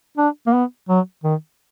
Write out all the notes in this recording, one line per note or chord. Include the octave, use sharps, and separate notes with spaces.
D4
A#3
B3
F#3
D#3